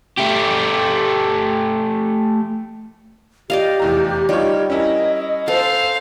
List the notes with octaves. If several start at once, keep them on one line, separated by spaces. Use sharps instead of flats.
A3 G4
G4 D5 D#5 F5
F1 E2 A#5
G3 D#4 F4 C#5
C#4 E4 A#4 D#5
A4 C5 F5